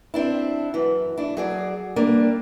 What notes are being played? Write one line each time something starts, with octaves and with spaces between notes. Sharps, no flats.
C4 D4 E4
F#2 E3
D4 E4
F#3 G#4 D5
G3 A#3 D4